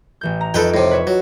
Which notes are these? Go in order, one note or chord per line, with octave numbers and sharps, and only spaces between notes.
A1 E3 G6
A#5
F2 D#4 A4 B4 G5 D7
A2 C3
B4 C#5 E5
F#3